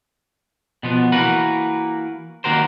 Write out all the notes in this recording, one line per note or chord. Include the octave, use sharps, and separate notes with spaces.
B2 F3 B3
E3 A#3 F#4 A#4 B4
D#3 A#3 F#4 A#4 C5